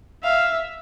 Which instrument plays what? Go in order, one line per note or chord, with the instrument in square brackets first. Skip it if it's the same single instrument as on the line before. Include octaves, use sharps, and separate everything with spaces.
[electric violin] E5 [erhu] F5